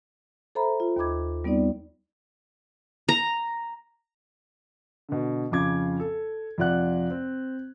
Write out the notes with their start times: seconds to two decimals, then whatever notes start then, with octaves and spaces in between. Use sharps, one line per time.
0.55 A4 C5 E5 A#5 B5
0.80 F4
0.96 D#2 D#5 B5 D6 G#6
1.44 G3 B3 C4 D#4 D5
3.09 A#5
5.09 B2 D3
5.52 F2 C#3 F4 D6 G#6
6.00 A4
6.58 F2 C3 F4 D5 F#5 F#6
7.11 C4